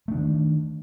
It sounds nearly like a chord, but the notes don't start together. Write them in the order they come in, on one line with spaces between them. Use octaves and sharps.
A3 D4 D#3